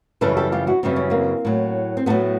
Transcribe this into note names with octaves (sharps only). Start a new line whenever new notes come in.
F#2 C#3 E3 G3 A4 B4
G4 A4
F4 G4
E4 F#4
F#2 C#3 E3 G3 C4
C#4
A#3 C4
A2 F#3
C4
A2 F#3 A3 B3